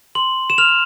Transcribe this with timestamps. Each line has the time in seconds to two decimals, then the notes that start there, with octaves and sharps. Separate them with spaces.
0.15 C6 F#7
0.50 E7
0.58 F6 F7